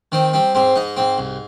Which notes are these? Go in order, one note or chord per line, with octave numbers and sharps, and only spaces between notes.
D#3 C4
G3 C4
G#2 C4
G#2 D#4
G#2 C4
C2